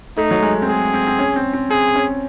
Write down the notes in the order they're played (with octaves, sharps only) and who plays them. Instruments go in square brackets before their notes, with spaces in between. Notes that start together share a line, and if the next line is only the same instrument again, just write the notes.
[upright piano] A3 [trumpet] D#4
[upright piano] F#3
G#3
C4
[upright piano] A3 [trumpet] G#4
[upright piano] C4
C4
C#4
C4
C4
[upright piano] C4 [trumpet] G#4
[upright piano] C#4